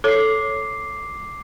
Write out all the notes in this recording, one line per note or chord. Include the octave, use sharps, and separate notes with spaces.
A4 C#5 D6 C7